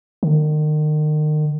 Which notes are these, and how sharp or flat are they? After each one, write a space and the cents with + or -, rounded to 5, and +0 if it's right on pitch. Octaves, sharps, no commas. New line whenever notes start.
D#3 -35